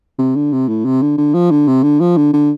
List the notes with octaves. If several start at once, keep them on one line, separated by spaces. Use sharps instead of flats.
C3
D3
C3
A2
C3
D3
D3
F3
D3
C3
D3
F3
D3
D3